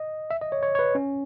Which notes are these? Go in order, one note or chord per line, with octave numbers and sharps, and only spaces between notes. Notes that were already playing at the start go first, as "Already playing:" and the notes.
Already playing: D#5
E5
D#5
C#5
C#5
C#5
B4
C#4